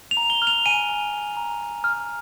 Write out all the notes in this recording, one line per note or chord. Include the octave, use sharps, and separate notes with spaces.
F7
A#5
G7
F6
F7
G#5 D#7
G#5
G#5
A#5
A#5
F6